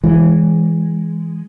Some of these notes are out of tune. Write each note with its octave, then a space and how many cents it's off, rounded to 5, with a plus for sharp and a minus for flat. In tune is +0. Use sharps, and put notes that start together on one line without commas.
E3 +0 G#3 -5